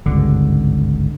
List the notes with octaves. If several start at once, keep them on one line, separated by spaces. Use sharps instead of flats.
G#1 C#2 G2 D3